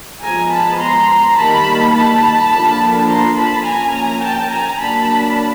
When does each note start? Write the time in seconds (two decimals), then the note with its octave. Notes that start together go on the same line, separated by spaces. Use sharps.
0.23 F3 G#3 B3 G#5 A#5
0.51 A5 B5
0.80 A#5 C6
1.37 D#3 G3 A#3 A5 B5
1.94 A5 B5
2.51 D3 F3 A#3 D4
3.08 A#5 C6
3.36 A5 B5
3.65 F3 A#3 C#4 G#5 A#5
4.22 G5 A5
4.51 G#5 A#5
4.79 F#3 A#3 D4 A5 B5